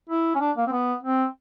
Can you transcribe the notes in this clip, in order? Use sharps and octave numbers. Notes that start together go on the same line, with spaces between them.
E4
C#4
D4
A#3
C4
B3
C4